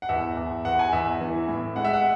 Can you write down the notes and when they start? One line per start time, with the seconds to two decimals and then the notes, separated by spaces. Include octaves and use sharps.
0.02 F#5
0.09 E2 E5
0.37 E2
0.64 E2 F#5
0.79 G#5
0.93 E2 E5
1.06 E5
1.20 E3
1.48 A2
1.76 G#3 F#5
1.85 E5
1.93 F#5